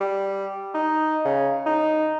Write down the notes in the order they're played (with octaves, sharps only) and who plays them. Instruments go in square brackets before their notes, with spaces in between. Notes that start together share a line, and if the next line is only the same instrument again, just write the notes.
[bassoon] G3
D#4
C#3
D#4